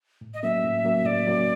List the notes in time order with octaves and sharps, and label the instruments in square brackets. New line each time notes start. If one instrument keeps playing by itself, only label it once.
[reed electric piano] A2
[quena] D#5
[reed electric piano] F#3 A#3 C#4 [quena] E5
[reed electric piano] A2
F#3 A#3 C#4
[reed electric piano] A2 [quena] D5
[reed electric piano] F#3 A#3 C#4